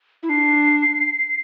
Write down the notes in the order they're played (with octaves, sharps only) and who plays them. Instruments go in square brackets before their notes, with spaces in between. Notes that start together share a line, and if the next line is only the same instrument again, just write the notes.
[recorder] E4
[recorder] D4 [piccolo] C7